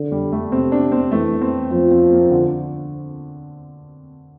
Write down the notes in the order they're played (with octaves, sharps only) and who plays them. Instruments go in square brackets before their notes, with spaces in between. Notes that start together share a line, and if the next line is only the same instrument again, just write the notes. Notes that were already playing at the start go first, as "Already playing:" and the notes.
Already playing: [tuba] D3
[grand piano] G3
A3
[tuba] C3 [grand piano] C4
[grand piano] D4
C4
[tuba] E3 [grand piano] A3
[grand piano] C4
[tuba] F3 [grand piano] C4
[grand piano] C4
A#3
D3